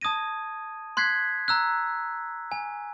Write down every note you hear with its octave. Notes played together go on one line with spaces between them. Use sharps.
A5 D#6 G#6 A#6 D#7
C6 F#6 G#6 B6 C7
A#5 E6 F#6
G#5